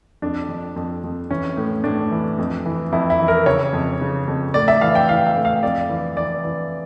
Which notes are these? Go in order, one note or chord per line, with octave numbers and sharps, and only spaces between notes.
F2 D4
F2
F2
F2
E3 C#4
A2
A2 D4
E3
F2
E3
F2 E4
E4
E3
A#4
C#3 C#5
F2
C#3
F2
A2 D5
E5
E3 F5
G5
E3 F5
F5
A2
F5
F2 D5
E3
E3 D5
E3